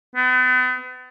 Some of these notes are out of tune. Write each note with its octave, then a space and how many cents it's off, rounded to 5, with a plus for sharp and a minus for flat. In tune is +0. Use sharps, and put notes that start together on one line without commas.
B3 +40